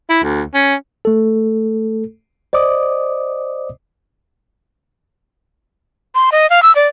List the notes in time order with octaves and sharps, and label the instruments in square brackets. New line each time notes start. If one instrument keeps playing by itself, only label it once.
[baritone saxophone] E4
D2
C#4
[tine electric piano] A3 A4
C5 D5 D#5 D6 D#6
[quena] C6
D#5
F5
E6
D5